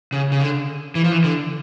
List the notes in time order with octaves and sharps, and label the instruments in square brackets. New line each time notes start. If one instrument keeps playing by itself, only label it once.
[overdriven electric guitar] C#3
C#3
D3
E3
F3
E3
D3